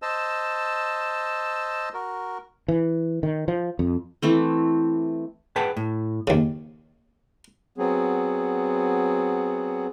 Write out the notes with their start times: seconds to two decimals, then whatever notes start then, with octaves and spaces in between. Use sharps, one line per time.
0.02 C5 D#5 A5 E6
1.94 F#4 A#4
2.68 E3
3.23 D#3
3.48 F3
3.79 F2
4.22 E3 A3 C4
5.56 G#4 B4 F#5 G5 A5
5.77 A2
6.27 D#2 C#3
7.78 F#3 B3 C4 G#4